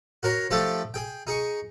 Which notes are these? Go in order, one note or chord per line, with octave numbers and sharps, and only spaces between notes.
F#4 A#4 C#5 A#5
F3 A3 D4 G4 A4
G#4 G5
D#4 G#4 C#6